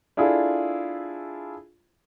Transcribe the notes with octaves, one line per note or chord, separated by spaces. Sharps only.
D4 E4 F4 G#4 A4